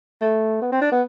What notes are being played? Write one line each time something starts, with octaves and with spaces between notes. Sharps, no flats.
A3
B3
C4
D4
B3